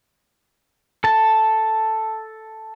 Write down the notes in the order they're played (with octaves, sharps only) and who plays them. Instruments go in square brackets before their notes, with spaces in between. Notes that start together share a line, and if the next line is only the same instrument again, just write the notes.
[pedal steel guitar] A4 A5